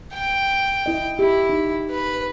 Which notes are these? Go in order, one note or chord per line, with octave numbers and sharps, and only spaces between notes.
G5
E4 D#5
E4 G4
D#4
B4